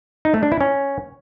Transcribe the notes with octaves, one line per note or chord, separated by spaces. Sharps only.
D#4
A3
D4
E4
C#4